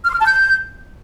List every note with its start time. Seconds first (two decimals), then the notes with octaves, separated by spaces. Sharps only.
0.04 F6
0.10 C6
0.15 F6
0.20 A5
0.25 G6